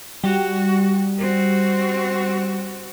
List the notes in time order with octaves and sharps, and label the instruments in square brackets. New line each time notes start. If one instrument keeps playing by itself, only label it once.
[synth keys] G3 [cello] F#4
[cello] C4 F#4